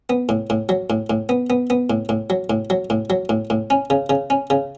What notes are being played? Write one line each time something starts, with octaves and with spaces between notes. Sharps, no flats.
B3
A2
A2
F#3
A2
A2
B3
B3
B3
A2
A2
F#3
A2
F#3
A2
F#3
A2
A2
C#4
C#3
C#3
C#4
C#3